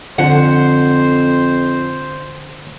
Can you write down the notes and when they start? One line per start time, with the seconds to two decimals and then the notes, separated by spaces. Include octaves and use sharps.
0.18 F2 D3 F3 C5 F#5